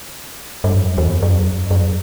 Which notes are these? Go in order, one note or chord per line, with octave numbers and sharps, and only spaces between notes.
G2
F#2
E2
F#2
F#2